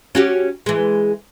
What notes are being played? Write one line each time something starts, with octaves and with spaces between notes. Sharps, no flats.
C#4 F#4 G4
E3 G#3